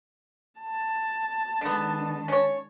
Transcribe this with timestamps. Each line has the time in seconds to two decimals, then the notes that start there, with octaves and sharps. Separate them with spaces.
0.60 A5
1.61 D3 D#3 G#3 B3 D4
2.28 C#4 C#5